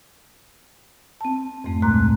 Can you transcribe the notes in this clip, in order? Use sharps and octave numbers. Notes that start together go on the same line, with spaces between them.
C4 A5
F2 G#2 A3 C4
D2 A#2 G#3 A#5 C6 F#6